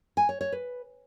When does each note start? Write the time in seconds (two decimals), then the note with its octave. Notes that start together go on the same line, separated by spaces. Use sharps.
0.17 G#5
0.29 C#5
0.41 C#5
0.52 B4